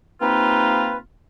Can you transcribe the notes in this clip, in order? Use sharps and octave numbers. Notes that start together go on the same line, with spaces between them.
C3 A#3 C4 D#4 F4 B4